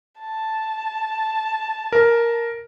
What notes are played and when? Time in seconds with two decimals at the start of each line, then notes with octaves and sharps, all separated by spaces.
0.20 A5
1.92 A#4